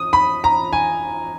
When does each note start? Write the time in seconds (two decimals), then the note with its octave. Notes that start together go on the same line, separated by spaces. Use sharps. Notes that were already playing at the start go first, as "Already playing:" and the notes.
Already playing: D#6
0.13 B5
0.44 A#5
0.73 G#5